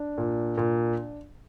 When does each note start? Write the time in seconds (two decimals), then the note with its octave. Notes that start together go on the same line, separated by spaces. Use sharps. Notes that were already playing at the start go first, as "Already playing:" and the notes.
Already playing: D4
0.18 A#2
0.58 A#2